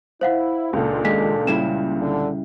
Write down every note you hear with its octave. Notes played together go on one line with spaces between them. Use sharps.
E4 C5 F5 F#5
C#2 A#2 D#3 D4 A4
D#2 G#3 B6
C#3 G3 E4 E7
D3